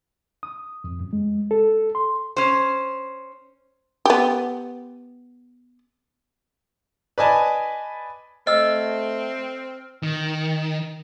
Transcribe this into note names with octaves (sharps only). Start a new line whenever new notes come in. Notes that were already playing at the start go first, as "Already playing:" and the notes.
D#6
F2
F#2
G#3
A4
C6
C#4 C5
B3 G4
B4 D5 D#5 G#5 A5
A3 C4 D#5 E6 F6
D#3